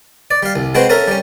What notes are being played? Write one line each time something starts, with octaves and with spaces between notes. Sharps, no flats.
D5
G3 F5
C2
G#3 C4 F#4 B4 G5
C#4 A4 A#4 E5
G3 C#4